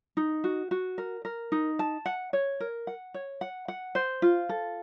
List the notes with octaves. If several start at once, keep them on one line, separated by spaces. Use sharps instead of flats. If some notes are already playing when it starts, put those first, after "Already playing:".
D#4
F#4
F#4
A#4
A#4
D#4
A5
F#5
C#5
A#4
F#5
C#5
F#5
F#5
C5
F4
A4